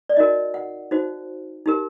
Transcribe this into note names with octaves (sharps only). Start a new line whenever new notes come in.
D5
D#4 F#4 A#4 D#5
F#5
D#4 F#4 C5
D#4 G4 A#4